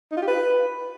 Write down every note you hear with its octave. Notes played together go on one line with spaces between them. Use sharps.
D#4
F4
G4
B4